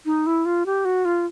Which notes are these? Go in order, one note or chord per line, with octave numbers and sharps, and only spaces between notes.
D#4
E4
F4
G4
F#4
F4